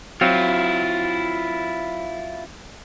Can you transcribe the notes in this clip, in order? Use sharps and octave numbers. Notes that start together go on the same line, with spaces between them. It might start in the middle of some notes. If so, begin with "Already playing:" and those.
F#3 C4 E4 F4 F5